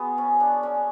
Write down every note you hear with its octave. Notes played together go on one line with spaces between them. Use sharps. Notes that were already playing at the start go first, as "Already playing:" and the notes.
Already playing: B3 F#4 G#4
C#4
D4
C#4